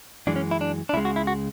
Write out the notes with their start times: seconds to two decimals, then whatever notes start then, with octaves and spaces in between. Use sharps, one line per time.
0.27 F#2 E3 G#3 D4
0.36 C#4
0.51 E4
0.61 D4
0.89 D4
0.93 C#2 C#3 G#3 E4
1.05 F#4
1.16 E4
1.27 F#4